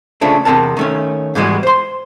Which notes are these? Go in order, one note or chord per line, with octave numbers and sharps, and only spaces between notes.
C#3 F3 A3 D4
E2 C3 C4 A#4 A5
D#3 A3 C#4
G#2 E3 G3 G#3 B3 F#4
C5 C6